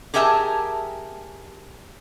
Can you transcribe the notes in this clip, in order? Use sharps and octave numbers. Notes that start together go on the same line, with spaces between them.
G4 G#4 A#4 E5 G5 A5